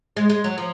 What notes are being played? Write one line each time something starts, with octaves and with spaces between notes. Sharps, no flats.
G#3
G#3
F#3
F3